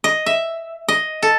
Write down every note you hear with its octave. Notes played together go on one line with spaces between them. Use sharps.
D#5
E5
D#5
A4